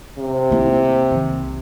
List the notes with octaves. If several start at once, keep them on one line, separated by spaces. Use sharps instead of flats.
C3
A#3 E4
C2 D#3